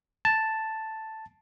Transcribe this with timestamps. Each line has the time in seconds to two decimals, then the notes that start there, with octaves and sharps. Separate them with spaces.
0.25 A5